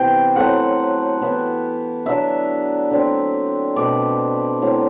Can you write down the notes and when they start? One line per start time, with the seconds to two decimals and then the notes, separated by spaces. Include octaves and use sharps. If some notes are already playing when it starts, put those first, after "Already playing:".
Already playing: C3 E3 B3 G5
0.36 A2 F#3 A3 C4 F#5
1.21 E3 B3 E4
2.06 D3 F#3 B3 D4 E5
2.91 D3 F#3 A3 C4
3.76 B2 A3 C4 D5
4.62 A2 F#3 C4